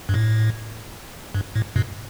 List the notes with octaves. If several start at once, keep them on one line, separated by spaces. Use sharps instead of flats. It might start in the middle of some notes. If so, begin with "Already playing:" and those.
G2
A2
G2
A2
G2 B2